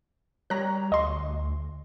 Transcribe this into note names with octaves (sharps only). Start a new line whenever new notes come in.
G3 C#5 A#5 F#6 A#6
D2 D#5 C6